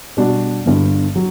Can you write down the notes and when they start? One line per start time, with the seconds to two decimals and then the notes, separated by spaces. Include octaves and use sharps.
0.17 B2 G3 D4 F#4
0.66 G1 G2 D3
1.16 F#3